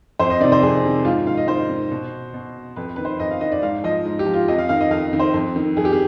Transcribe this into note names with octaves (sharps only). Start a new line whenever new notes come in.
F2 C5
D#5
C3 D#3 D5
C5
F2 G#4
C3 D#3
G#2 F4
D#3 F5
D#5
G#2 C5
D#3
B2
B2
F2 B4
D#3 B4
C5
F2 D#5
F5
D#3 D#5
D5
G#2 F5
F3 D#5
G#2
G4
F3
F4
F2 D#5
F5
D#3 F5
D#5
F2 F5
D#3
C5
F2
D#3
F2 G#4
G4
G#4